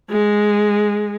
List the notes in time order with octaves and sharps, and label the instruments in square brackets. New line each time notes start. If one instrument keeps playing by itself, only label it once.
[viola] G#3